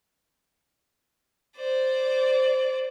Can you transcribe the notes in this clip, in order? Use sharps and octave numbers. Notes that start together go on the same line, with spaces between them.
C5 D5